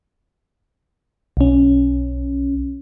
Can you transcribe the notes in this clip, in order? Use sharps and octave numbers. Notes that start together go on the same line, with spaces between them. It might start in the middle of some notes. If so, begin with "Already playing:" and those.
B1 C#4